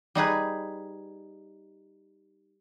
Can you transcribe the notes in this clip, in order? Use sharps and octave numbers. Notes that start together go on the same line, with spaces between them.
G3 D#4 G#4 B4